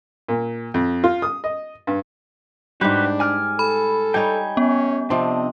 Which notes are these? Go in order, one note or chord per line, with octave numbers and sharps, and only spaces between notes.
A#2
F2
F4
D#6
D#5
G2
G#2 G3 D4 F#4 G4 B4
D5 G#5 F6
A4 B5
G3 D#4 C#5 G5 G#5
B3 C#4
C3 F3 C4 D4 D#5